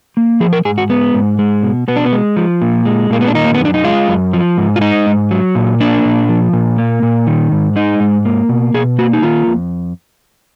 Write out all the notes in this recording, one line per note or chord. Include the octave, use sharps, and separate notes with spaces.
A#3
F3 G#4
A#4
G#2 G#4
F#4
G#3 B3
G#2
G#3
B2
B2 B3
D4
B3
G#3
F3
A#2
G#3
A#2 A#3
B3
D4
D#3 D#4
A#3
B3
F#2
D4
D#4
G#3 F4
F#2
F3
G#2
F4
G#3 D#4
G#2
F#3
A#2
A#3 D4
A#2
F3
A#2
A#3
A#2
D#3
G#2
G#3 D#4
G#2
A#3
B2
B2 G#4
A#3 F#4
D#4
D#3 F4
F2